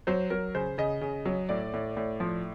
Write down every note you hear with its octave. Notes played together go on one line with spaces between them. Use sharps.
F#3 C5
F#3 A#4
C#3 C5
C#3 D#5
C#3
F#3
A2 D5
A2
A2
F3